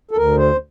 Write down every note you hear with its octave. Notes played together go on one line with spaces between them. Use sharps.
A4
D2 A#4
C5